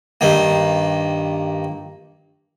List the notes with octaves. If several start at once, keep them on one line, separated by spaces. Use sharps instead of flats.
G2 D#3 A#3